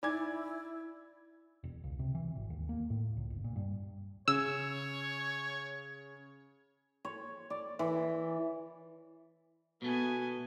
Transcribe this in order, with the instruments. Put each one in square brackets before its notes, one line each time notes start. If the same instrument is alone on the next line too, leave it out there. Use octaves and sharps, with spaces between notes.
[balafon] D#4 G#5 D6 [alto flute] E4 [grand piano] D5 G#6
[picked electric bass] E1
C#2
C3
E3
G#1
D#2
A#3
A2
C#2
G1
A#2
G2
[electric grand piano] C#3 [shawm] C#5 [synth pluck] E6
[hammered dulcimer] C#5
D5
E3
[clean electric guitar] B2 A3 [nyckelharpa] B3 G#5